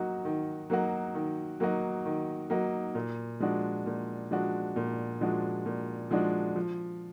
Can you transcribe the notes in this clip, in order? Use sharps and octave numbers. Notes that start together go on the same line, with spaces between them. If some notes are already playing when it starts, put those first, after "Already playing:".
Already playing: F#3 A#3 D#4 F#4
D#3
F#3 A#3 D#4 F#4
D#3
F#3 A#3 D#4 F#4
D#3
F#3 A#3 D#4 F#4
A#2
F3 G#3 D4 F#4
A#2
F3 G#3 D4 F#4
A#2
F3 G#3 D4 F#4
A#2
F3 G#3 D4 F#4
F3